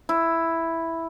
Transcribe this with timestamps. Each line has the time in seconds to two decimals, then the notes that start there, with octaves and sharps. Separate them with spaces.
0.09 E4